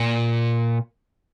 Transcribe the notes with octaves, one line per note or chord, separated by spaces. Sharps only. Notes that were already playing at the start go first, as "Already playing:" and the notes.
Already playing: A#2